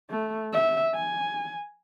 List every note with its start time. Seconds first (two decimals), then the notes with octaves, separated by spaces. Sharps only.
0.10 A3
0.53 E5
0.95 G#5